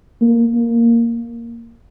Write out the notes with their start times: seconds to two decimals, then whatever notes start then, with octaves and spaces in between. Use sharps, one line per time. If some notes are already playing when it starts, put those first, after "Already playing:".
0.21 A#3
0.55 A#3